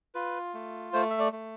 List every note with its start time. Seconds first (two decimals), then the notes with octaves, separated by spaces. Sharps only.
0.15 F4 B4
0.54 A3
0.93 A3 C5
1.10 E5
1.20 D5
1.33 A3